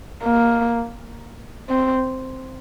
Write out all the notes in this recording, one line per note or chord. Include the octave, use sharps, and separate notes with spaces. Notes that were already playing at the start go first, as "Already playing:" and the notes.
A#3
C4